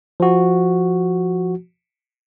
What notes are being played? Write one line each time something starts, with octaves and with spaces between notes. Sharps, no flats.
F3 F#4